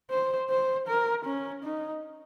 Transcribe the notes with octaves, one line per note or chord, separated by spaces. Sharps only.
C5
C5
A#4
C#4
D#4